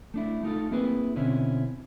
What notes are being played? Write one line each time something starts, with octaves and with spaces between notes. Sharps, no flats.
A3 D4 E4
A3 D#4 F4 A4
A#3 C4 E4 G#4 B4 E5
B2 D3 C4 C#4 E4